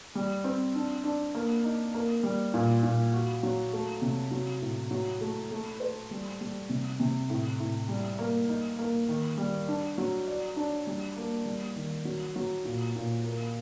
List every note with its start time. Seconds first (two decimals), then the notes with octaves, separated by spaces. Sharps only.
0.15 G3
0.44 C4
0.75 D4
1.04 D4
1.35 A#3
1.64 D#4
1.94 A#3
2.23 G3
2.54 A#2
2.83 A#2
3.13 F#4
3.43 F#3
3.73 A3
4.02 C3
4.31 F#3
4.61 A2
4.91 F#3
5.21 A3
5.51 A3
5.80 C5
6.11 G3
6.41 G3
6.69 C3
7.00 C3
7.30 A2
7.60 A2
7.88 G3
8.19 A#3
8.49 D#4
8.79 A#3
9.09 D#3
9.38 G3
9.68 D4
9.98 F#3
10.27 D5
10.56 D4
10.87 G3
11.16 A#3
11.46 G3
11.76 D#3
12.05 F#3
12.36 F#3
12.65 A#2
12.96 A#2
13.25 A#3